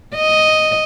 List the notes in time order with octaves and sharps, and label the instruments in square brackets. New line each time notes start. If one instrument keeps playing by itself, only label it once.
[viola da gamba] D#5